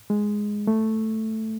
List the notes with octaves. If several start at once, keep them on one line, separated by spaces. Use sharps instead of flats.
G#3
A3